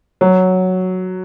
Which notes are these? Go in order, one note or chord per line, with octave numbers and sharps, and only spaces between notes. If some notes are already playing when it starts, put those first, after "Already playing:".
F#3